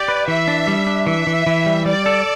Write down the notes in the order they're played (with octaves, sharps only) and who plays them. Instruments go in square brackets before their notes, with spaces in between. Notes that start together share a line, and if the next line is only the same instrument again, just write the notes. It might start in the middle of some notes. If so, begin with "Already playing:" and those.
Already playing: [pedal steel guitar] G4 [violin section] D5
[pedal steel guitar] B4
[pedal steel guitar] E3 [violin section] E5
[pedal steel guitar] D4
G3
D4
[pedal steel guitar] E3 [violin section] E5
[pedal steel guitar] E3
E3
G3
[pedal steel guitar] G3 [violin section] D5
[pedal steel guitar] A4